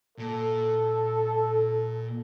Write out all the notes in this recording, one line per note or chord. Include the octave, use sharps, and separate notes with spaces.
A#2 A4